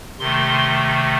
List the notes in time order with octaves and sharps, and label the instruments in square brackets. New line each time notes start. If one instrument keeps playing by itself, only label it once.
[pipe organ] C3 D#3 A3 C6